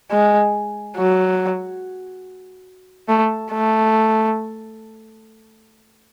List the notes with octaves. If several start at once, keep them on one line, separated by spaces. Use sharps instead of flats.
G#3
F#3
A3
A3